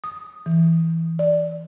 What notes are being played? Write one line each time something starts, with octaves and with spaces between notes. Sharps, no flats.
D#6
E3
D5